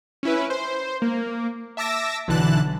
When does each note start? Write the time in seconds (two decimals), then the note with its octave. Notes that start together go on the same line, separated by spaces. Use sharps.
0.23 C#4 E4 B4
0.50 C5
1.02 A#3
1.77 E5 A5 D6 E6 A#6
2.28 B1 D3 E3 A5 F#6